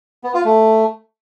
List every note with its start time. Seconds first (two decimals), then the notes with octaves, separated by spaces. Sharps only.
0.24 B3
0.34 F4
0.45 A3